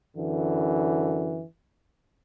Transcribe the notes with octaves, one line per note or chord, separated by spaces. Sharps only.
F#2 D3 E3